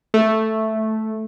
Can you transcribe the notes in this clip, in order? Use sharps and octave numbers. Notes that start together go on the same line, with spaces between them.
A3